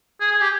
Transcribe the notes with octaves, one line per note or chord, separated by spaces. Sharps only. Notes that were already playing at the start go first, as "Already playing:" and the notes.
G#4
G#4
G4